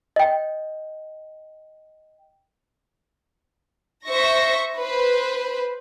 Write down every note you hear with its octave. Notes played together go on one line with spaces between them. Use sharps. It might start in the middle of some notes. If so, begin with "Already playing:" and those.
D#5 G5
C5 E5 C#6 A#6
B4 C5